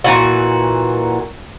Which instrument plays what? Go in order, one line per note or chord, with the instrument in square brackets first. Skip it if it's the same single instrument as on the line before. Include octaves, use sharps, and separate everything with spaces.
[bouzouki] A#2 E3 F#4